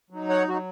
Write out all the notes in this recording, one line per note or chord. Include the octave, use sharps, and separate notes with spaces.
F#3 D#4
C#5 F#5
F#3 D#4 F#4